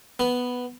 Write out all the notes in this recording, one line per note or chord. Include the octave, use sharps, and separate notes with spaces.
B3